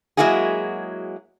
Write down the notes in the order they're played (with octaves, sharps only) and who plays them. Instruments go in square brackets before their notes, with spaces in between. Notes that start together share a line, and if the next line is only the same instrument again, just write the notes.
[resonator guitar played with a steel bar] F#3 G#3 A#3 E4 F#4 G#4